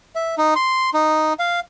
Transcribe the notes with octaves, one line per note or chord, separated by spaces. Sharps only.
E5
D#4
C6
D#4
F5